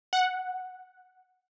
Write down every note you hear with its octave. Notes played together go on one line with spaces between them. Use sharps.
F#5